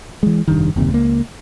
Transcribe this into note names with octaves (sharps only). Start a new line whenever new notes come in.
E3 G#3
F1 G2 D#3
F#1 D#2 C3
C#2 A#3